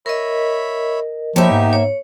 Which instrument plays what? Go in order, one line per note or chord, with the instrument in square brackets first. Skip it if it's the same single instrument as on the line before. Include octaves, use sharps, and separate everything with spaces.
[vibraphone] A#4 D#5 [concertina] C#5 E5 B5
[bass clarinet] F3 [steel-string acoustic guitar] A#3 E5 [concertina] D#4 G4 [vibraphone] C#5 B5
[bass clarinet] G#2
[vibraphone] C#5